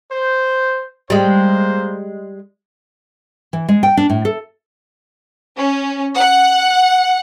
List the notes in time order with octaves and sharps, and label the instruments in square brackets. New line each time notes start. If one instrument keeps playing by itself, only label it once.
[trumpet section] C5
[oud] G3 G#3 [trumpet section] A#3 C5
[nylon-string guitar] E3
G#3
G5
D4
A2
A4
[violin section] C#4
F#5